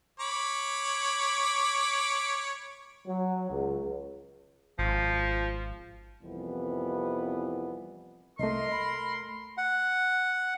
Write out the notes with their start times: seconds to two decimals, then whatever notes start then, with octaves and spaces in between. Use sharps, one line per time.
0.20 C#5 B5 D6
3.08 F#3
3.51 C#2
4.79 G#1 F3
6.23 C2 F2 E3 G3 B3
8.39 C2 A3 A#4 D#5 C6
8.72 B5
9.57 F#5